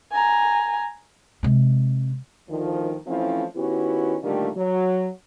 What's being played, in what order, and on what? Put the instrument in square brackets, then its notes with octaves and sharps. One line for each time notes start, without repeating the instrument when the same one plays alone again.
[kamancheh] G#5 A#5
[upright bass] C3 G#3
[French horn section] D2 D#3 F3
E3 F3 A3 C4 C#4 E4
D#3 B3 C#4 E4 F#4 G4
A#2 D3 D#3 G3 A3 A#3
F#3